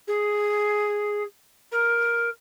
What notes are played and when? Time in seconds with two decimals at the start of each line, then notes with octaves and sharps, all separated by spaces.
0.07 G#4
1.71 A#4